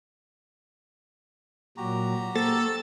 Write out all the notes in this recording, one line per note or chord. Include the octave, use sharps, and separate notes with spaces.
A#2 F#3 F#4 G4 A#5
A#3 A4 C5 E6 A6